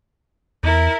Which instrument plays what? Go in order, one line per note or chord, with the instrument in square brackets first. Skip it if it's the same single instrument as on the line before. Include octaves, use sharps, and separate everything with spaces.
[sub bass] E2 [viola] E4 A#4